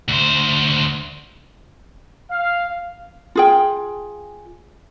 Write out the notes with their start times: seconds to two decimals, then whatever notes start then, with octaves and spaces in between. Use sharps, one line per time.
0.08 D2 C5
2.30 F5
3.35 F4 G#4 G5